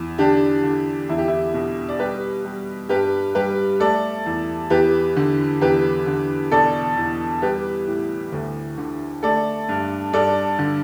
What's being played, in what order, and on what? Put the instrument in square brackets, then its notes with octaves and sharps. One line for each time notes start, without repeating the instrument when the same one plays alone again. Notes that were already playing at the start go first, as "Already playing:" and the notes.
Already playing: [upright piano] E2
D3 D4 G4
D3
E2 E4
G4
E4
B2
D5
G3 G4 B4
G3
G2 G4 B4
G3 G4 B4
A3 A4 D5
E2
E2 G4 B4
D3
E2 G4 B4
D3
B2 A4 D5
E2
G3 G4 B4
A2
D2
D3
A3 A4 D5
G2
G2 A4 D5
D3